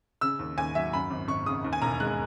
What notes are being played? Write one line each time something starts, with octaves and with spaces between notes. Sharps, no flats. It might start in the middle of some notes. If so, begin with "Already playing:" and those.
C#3 E6
D#2
D#2 G#5
F#3 E5
F#2 B5
G#1
G#1 C#6
C#3 D#6
D#2
G#5
E1 A#5
G#3 F#6